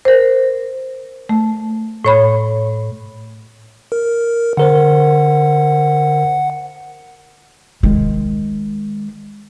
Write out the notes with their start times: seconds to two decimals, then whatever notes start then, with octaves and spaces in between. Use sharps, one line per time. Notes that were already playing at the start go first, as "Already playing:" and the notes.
0.05 A#4 C5
1.29 A3
2.05 A2 C#5 B5
3.92 A#4
4.57 D3 A#4 C5 F#5
7.83 D#3 G#3